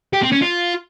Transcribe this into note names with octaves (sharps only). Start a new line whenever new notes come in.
G4
C4
C#4
F4